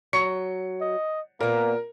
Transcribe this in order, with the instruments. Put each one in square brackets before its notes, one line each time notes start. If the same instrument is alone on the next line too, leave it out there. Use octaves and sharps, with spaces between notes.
[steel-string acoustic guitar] F#3 [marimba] C#6 [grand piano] C#7
[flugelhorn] D#5
[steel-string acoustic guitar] A#2 B3 [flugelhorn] A#3 [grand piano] A#4